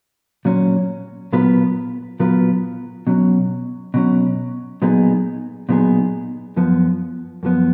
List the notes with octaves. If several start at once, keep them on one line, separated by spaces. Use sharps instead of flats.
A#2 F#3 C#4
A#2 F#3 B3 F4 B4
A#2 F#3 B3 F4 B4
B2 F#3 C#4
B2 F#3 C#4
A#2 F#3 B3 D#4 G#4
A#2 F#3 B3 D#4 G#4
F#2 F3 B3
F#2 F3 B3